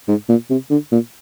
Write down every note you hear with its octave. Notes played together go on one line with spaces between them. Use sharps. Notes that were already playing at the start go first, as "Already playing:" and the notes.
G#2
A#2
C3
D3
A#2